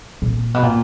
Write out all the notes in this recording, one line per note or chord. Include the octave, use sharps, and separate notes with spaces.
A#2
B2
A#2